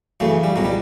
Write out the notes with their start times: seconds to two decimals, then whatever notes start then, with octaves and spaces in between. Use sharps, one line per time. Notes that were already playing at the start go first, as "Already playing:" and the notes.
0.20 F#2 C#3 E3 A3
0.44 G3
0.56 C#2 B2 F#3
0.64 G3